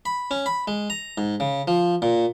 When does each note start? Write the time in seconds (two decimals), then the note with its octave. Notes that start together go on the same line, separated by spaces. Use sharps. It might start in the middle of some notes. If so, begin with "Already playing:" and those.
0.06 B5
0.31 C#4
0.46 B5
0.68 G#3
0.90 A#5
1.18 G#2
1.40 C#3
1.68 F3
2.02 A#2